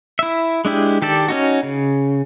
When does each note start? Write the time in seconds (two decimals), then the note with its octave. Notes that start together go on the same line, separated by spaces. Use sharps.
0.19 E4 E5
0.65 G#3 D4 E4 G4
1.02 D#3 G4 A4 D5
1.28 C#4 D#4 F#4
1.63 C#3